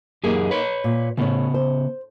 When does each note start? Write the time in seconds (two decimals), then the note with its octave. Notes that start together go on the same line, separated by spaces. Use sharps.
0.24 F#2 A#3 D#4 G4 G#4
0.51 B4 C#5
0.84 A#2
1.18 A2 C#3 B3 C#5
1.54 C5